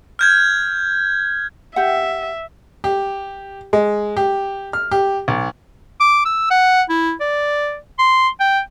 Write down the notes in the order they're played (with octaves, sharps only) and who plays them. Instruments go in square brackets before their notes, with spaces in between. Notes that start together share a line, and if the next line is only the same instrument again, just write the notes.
[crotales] F6 G6 G#6
[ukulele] G4 F#5 [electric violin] E5
[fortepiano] G4
G#3
G4
F6
G4
B1
[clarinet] D6
E6
F#5
E4
D5
C6
G5